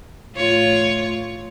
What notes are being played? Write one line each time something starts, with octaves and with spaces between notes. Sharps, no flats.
A2 F4 C#5